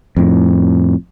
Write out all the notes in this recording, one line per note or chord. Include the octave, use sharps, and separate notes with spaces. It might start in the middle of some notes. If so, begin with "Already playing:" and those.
F2 A2